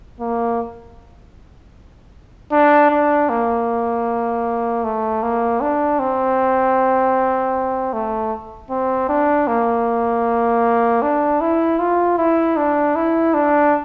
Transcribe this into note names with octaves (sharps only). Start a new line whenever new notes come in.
A#3
D4
D4
A#3
A3
A#3
D4
C4
A3
C4
D4
A#3
D4
E4
F4
E4
D4
E4
D4